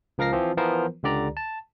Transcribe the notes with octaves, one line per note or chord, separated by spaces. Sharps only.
C#2 F3 A#4 F5 A#6 C7
E3 F3 C4
E3 F3 B3 F4 A#4 C5
C#2 D3 G4 D5 A#5
A5